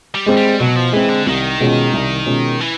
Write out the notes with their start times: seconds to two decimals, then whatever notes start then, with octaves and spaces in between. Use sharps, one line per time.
0.14 G3
0.26 G#3 C4
0.37 G3
0.60 B2 F#3
0.76 F3
0.92 E3 G#3 C4
1.09 D3
1.27 C2 D#3
1.60 B2 G#3 C#4 F4
1.93 C2
2.26 B2 G#3 C#4 F4
2.61 E3